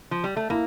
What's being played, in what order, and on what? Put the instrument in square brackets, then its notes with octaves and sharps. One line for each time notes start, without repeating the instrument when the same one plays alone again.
[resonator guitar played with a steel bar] F3
G3
A3
[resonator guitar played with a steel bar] A#3 [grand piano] E4